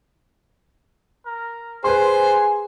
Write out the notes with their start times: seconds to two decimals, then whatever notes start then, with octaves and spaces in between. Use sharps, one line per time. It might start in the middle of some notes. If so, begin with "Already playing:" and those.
1.26 A#4
1.84 G#4 B4 C5 G#5 C6